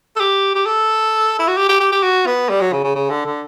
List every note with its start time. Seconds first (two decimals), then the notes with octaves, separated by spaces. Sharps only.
0.16 A4
0.20 G4
0.55 G4
0.66 A4
1.39 E4
1.48 F#4
1.57 G4
1.69 G4
1.80 G4
1.92 G4
2.03 F#4
2.26 B3
2.49 G3
2.61 F#3
2.72 C#3
2.84 C#3
2.95 C#3
3.10 D3
3.26 D3